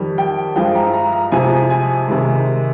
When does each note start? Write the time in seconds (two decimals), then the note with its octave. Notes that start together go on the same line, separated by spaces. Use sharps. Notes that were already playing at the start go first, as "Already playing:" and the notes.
Already playing: F2 D#3 G3
0.18 G5
0.56 G2 F3 G#3 G5
0.75 A#5
0.94 A#5
1.12 A#5
1.32 F2 C3 F3 G#3 G#5
1.70 G#5
2.08 C3 D#3 G#3